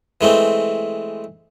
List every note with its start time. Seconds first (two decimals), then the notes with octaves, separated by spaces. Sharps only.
0.21 E3 G#3 A3 C4